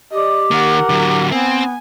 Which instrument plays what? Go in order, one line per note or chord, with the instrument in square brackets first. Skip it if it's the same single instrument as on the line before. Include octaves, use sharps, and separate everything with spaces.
[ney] G4 [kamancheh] D5 D#5
[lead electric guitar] D#3 A#3 [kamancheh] A#4 F#5
[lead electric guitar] D3 F#3
[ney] B3 [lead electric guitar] C4 [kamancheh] G#5